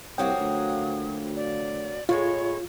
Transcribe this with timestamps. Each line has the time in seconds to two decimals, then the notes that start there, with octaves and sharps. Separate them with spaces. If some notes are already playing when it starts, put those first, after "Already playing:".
0.18 C2 F3 F#3 A#3 G5 D#6
0.40 D2
1.35 D5
2.09 A2 D3 G#3 F4 C#5